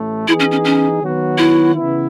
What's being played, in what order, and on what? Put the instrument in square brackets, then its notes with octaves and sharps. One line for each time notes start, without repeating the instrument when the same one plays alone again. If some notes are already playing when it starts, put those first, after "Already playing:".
Already playing: [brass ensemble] A1 A2 A3
[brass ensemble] E3 B3 D#4 G#4 [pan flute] E4
[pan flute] C#4
C#4
C#4
[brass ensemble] D#3 F#3 B3 F#4
[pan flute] E4
[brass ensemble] C#3 E3 B3 E4